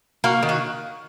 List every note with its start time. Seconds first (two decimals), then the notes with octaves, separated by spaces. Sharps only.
0.24 A#3 F#4 A#4
0.43 D#3
0.49 F#4